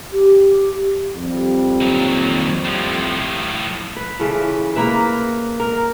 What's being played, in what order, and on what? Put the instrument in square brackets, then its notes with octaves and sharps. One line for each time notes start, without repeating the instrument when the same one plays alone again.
[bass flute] G4
[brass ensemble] F2 G3
[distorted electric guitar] D#2 F#3
A2 F3
[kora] B4
C#3 E3 F4 A4
A#3 A#4 B4 E5
A#4